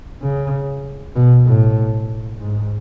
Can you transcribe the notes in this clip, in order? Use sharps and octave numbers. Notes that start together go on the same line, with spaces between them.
C#3
B2
A2
G#2